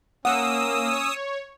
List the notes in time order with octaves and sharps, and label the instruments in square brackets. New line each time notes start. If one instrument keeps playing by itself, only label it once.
[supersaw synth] A#3 [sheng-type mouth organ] C#4 [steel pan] F#5 [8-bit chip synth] D#6 E6
[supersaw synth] C#5